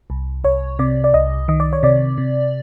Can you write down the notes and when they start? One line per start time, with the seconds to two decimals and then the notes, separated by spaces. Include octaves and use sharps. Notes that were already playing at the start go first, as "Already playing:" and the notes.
0.10 C2
0.44 C2 C#5
0.79 C3 D5
1.04 D5
1.14 C2 D#5
1.48 D#3 D#5
1.60 D5
1.73 C#5
1.83 C3 D5
2.18 C3